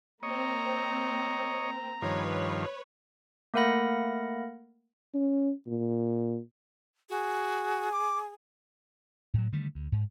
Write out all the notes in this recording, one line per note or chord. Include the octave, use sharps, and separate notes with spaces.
A#3 C4 C#5 D#5 A#5
G2 D#3 F3 B4 C#5
A3 A#3 A#4 F#5 B5 A#6
C#4
A#2
F#4 G#4
D6
A2 F#3
D3 D#3 G3 A3
D2
G#2